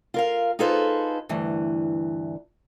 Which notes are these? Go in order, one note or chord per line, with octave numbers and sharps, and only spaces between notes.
F4 A#4 F5
D#4 F4 G#4 A4 B4 C5
D2 G2 E3